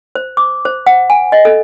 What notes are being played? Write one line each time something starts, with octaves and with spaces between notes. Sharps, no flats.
C5
D6
C5
F#5
G#5
D#5
A4